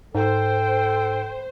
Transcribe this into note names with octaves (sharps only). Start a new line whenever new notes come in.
G#2 A4 C5 G5